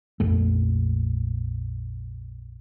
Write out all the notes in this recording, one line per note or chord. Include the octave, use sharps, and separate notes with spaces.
A#1 F2 A3